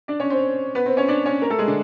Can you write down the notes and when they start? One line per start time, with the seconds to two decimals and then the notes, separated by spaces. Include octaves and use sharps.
0.08 D4 D5
0.20 C#4 C#5
0.30 C4 C5
0.75 B3 B4
0.86 C4 C5
0.97 C#4 C#5
1.08 D4 D5
1.26 C#4 C#5
1.42 A#3 A#4
1.50 A3 A4
1.58 G#3 G#4
1.67 D3 D4